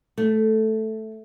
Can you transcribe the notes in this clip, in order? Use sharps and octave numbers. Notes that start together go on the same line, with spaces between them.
A3